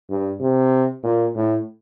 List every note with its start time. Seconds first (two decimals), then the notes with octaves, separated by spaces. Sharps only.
0.10 G2
0.41 C3
1.03 A#2
1.35 A2